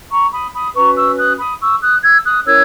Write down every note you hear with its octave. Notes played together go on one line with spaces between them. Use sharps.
A#5 C#6
B5 D#6
B5 D#6
C#4 F#4 B4 A#5 C#6
C#6 E6
D#6 F#6
B5 D#6
C#6 E6
D#6 F#6
E6 G#6
D#6 F#6
C#4 E4 A#4 C#5 E6 G#6